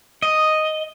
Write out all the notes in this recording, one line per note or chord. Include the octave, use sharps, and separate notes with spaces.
D#5